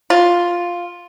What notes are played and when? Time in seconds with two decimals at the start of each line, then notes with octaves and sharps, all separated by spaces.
0.10 F4